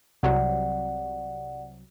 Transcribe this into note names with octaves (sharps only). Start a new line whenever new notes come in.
C2 C3 F#3 D5 F#5